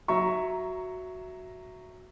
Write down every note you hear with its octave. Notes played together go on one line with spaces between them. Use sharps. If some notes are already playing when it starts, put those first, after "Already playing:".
F#3 E5 A#5 C#6